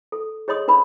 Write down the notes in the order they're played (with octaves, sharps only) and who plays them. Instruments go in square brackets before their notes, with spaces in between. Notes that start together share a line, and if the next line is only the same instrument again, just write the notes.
[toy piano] A4
G#4 C#5 D#5 C6 D#6
D4 B4 B5